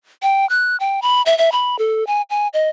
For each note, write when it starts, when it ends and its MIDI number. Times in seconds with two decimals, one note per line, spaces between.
0.22 0.48 79
0.50 0.77 90
0.80 1.00 79
1.02 1.22 83
1.26 1.37 76
1.38 1.52 76
1.52 1.78 83
1.79 2.06 69
2.07 2.22 80
2.30 2.48 80
2.54 2.69 75